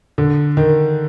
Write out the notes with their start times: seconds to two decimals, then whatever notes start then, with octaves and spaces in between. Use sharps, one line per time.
0.18 D3
0.57 D#3